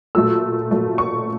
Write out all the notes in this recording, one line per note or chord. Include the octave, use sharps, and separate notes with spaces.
A#2 F#3 A3 E6
A#2 F#3 A3
C#6